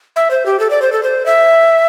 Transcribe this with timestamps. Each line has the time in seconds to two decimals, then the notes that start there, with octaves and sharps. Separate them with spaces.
0.16 E5
0.31 C5
0.46 G4
0.60 A4
0.70 D5
0.82 C5
0.92 A4
1.03 C5
1.26 E5